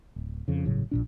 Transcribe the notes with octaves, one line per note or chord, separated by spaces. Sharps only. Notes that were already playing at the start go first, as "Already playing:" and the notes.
D1
F2 C#3
G1 A2 C#3 F#3
A#1 A#2 D4